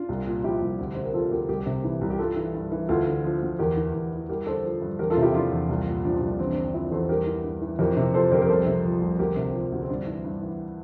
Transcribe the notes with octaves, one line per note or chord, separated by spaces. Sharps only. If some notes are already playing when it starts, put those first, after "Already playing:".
Already playing: D4 F4
C2
A#2
F3 E4 G4
C2
D2
C3 C5
A#4
F3 F4 A4
D2 G4 A#4
C2 G4 A#4
C3
E3
C2
G4
G2 F4 A4
E3
G2
E3
D2 F4 A4
D3
F3
D2
E2 G4 A#4
E3
E2
E3
G2 G4 A#4
D3 A4 C5
F3
G2
E2 G4 A#4
F4 A4
C3
E4 G4
F3 D4 F4
E2
C2
A#2
F3 D4
D4
C2
D4
E2 C4
D4
D3
D4
F3 C4 E4
E2 A4 C5
G2 G4 A#4
E3
G2
E3
F2 G4 A#4
C3
F3 A4 C5
F2 G4 A#4
A#4
C2 A4 C5
C3
F3
C2
D2 G4 A#4
C3
F3
D2
C4
G2 D4
E3
G2
E3